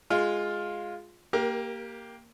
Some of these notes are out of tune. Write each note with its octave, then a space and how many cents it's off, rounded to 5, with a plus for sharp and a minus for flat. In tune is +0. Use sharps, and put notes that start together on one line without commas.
G#3 +0 F4 +10
A#3 -5 G4 +0 A#4 +25